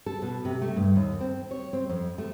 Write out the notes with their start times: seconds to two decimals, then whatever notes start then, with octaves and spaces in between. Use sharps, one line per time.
0.06 A4
0.22 B2
0.45 C3
0.62 A3
0.76 G2
0.96 D#2
1.21 C4
1.51 C#5
1.73 C4
1.89 F2
2.18 A3